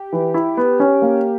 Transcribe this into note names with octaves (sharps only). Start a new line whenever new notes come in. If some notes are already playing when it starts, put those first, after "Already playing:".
Already playing: G4
E3
E4
B3
C#4
A#3